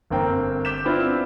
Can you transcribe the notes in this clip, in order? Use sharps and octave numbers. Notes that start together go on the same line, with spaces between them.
G1 A#3 C4 G5 A#5
D6 G6 B6 E7
B3 C4 D4 E4 F4 B4